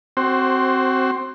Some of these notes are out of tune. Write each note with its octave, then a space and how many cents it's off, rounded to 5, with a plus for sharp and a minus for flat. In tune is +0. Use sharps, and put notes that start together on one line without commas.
C4 +0 F#4 +20 C5 +20